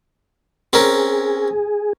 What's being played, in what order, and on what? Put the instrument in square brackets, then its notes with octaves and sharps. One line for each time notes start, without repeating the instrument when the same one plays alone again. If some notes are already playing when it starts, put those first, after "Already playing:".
[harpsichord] C4 C#4 A#4 [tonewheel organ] G#4